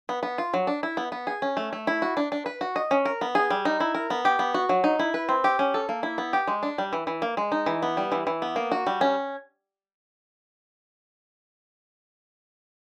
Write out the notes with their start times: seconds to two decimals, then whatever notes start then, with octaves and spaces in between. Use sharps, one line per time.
0.09 B3
0.23 B3
0.38 F4
0.54 F#3
0.67 D4
0.83 E4
0.97 B3
1.12 B3
1.27 G#4
1.42 C#4
1.57 A3
1.73 A3
1.87 E4
2.02 F#4
2.17 D4
2.32 D4
2.46 B4
2.61 F#4
2.76 D#5
2.91 C#4
3.05 A#4
3.21 B3
3.35 G#4
3.50 G3
3.65 D#4
3.80 E4
3.95 A#4
4.10 B3
4.25 G4
4.39 B3
4.54 F#4
4.69 F#3
4.84 D#4
4.99 E4
5.14 B4
5.29 C4
5.44 G4
5.59 C#4
5.74 A4
5.89 A#3
6.03 E4
6.18 B3
6.33 G4
6.47 G#3
6.63 D4
6.78 G3
6.93 E3
7.07 E3
7.22 A#3
7.37 G#3
7.52 D#4
7.66 E3
7.82 B3
7.97 G3
8.12 E3
8.27 E3
8.42 B3
8.56 A#3
8.72 F#4
8.87 G3
9.01 C#4